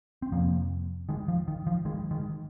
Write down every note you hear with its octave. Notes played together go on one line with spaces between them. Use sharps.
C4
F2 C3 F3 A#3
D#3 G#3
F3
D#3
F3
D#3 G#3
D#3 G#3